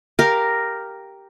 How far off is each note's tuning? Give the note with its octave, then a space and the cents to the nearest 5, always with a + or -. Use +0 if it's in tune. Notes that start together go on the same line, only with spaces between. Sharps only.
G4 +0 A#4 +0 F5 +0